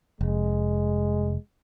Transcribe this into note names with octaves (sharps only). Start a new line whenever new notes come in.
F1 G#3